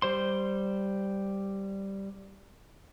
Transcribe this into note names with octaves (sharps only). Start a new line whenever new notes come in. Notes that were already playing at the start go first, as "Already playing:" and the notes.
G3 C5 C6